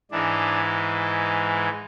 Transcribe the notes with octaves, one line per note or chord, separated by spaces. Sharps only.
G#2 E3 G#3 D4